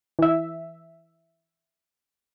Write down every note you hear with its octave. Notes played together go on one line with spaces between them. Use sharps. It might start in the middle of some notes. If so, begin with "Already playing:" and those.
E3 E5